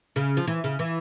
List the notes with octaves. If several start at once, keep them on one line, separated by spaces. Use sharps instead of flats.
C#3
F3
E3
C#3
E3